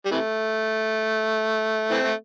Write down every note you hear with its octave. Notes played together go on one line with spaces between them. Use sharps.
G3
C3 E3 A3
E3 A3 C4
A3